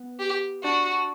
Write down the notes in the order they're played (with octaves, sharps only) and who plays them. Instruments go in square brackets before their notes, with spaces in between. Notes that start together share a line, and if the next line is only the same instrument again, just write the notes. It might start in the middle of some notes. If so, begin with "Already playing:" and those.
Already playing: [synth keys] B3
[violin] G4
[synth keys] D4 [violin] F#4